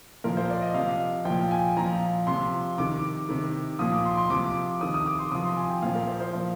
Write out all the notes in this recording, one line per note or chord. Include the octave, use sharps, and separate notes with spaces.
A#2 F3 A#4
C5
D5
D#5
C3 F3 F5
A#2 F3 G5
G#5
A#2 F3 A#5
C3 F3 C6
C3 D#3 D6
C3 D#3
A#2 F3 D#6
D6
C6
C6
C3 F3 D6
C3 D#3 D#6
D#6
D6
C6
C3 F3 D#6
C6
G#5
G5
A#2 F3 F5
A#4
C5
C5
A#2 F3